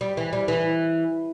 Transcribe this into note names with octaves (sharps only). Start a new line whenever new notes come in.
G3
E3
G3
E3